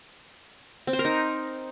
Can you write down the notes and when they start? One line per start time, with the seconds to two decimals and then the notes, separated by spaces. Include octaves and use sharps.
0.87 C4
0.93 C5
0.99 A#4
1.05 D#4